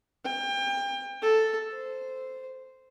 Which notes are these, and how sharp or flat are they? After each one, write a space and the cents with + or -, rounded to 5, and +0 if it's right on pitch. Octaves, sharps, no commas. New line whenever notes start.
G5 +30
A4 +0
C5 -10